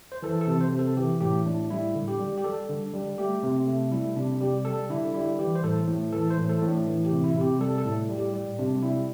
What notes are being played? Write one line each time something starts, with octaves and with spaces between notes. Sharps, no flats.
C5
E3 A4
A4
C3
C5
C3
A4
E3 G4
A2 G4
A2 D4
G3 E4
D3
G4
G3
G4
G3 A4
D3
G3
A3 G4
C3
A3
G3 E4
C3 D4
G3 G4
G3 A4
D3 E4
G3 E4
E3 G4
C5
A2 A4
A2
E3 A4
C5
A2
A4
A2
D4
E3
G4
C3
E4
C3
G4
G3 A4
A4
A2
G3
G4
G3
C3 D4
G3 E4